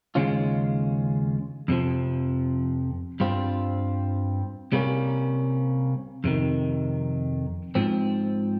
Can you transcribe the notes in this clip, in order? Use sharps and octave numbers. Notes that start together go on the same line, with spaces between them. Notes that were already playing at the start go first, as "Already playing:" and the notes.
D#2 C#3 G#3 C#4 F4
F2 C3 F3
G2 G3 C4 F4
C2 C3 G3 A#3 C#4
F2 C3 D#3
G#2 F3 C4